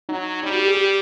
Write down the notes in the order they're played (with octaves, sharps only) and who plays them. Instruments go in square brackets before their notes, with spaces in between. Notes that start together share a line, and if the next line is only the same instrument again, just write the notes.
[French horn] F#3 [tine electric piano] D#4
[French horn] G3 [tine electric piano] D#4
[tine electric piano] F#4
G4
G#4
G4